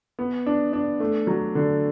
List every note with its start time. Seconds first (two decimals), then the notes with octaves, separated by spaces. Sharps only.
0.19 B3
0.46 D4
0.73 D4
1.00 A3
1.27 F#3
1.55 D3